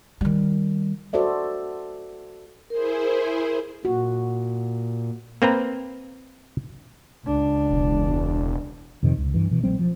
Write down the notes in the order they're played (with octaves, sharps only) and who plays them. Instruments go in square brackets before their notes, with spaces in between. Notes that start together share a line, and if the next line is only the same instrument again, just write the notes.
[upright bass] D#3 G3
[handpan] F#4 A4 C5 D5 E5
[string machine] E4 G#4 C5 [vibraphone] A#4
[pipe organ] A#2 [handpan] F#4
[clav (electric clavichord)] A#3 C4 B4 A#5
[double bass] C#2 D4
[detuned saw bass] E1
[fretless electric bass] F2 C3 D#3
C#2
G2 E3
B2 E3
A#1 F#3 G#3 C4
F3